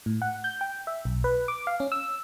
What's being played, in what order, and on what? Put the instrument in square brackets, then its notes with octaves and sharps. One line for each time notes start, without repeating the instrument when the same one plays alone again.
[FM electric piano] A2
F#5
G6
G5
E5
B1
B4
D6
F5
C#4
E6